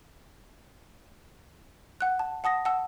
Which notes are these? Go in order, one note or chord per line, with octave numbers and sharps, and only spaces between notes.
F#5 F#6
A5
F#5 A5 D#6 A#6
F#5 A5 E6